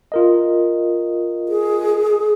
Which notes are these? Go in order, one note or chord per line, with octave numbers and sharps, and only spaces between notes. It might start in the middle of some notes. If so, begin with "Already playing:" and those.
F4 A#4 D#5
G#4